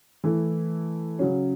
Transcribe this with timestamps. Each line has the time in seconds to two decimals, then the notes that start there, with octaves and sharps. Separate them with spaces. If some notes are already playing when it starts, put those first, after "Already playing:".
0.24 E3 A3 E4
1.19 C#3 F#3 C#4